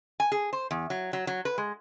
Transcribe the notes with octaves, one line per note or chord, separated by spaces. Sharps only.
G#5
G#4
C5
E2
F#3
F#3
F#3
B4
G#3